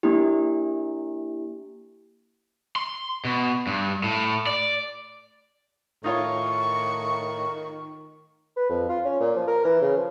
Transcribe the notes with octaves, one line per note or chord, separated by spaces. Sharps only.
A#3 D4 E4 G4
C6
B2
G2
A2
D5
A2 D#3 D#4 F4 C#5 C#6
B4
F2
F4
C#4
A#2
F3
A#4
E3
C#3
F3